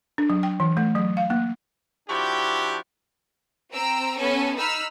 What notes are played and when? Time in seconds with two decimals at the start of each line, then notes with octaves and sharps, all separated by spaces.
0.18 D4
0.30 F#3
0.43 G5
0.60 E3
0.77 A3
0.95 F#3
1.17 F5
1.30 A#3
2.09 F3 D4 E4 F#4 G4
3.72 C4 A#5 E6 D7
4.19 B3 C#4 A4 G#5
4.57 D#4 B5 E6 F6